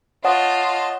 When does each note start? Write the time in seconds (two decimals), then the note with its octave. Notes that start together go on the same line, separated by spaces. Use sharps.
0.25 F4 C#5 D#5 F#5 A5